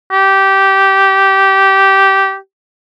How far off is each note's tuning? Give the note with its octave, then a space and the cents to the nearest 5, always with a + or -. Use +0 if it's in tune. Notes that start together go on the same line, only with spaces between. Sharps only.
G4 -15